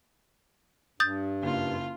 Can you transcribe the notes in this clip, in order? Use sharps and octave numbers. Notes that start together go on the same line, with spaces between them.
G2 D#6 G6 A6
F#1 F4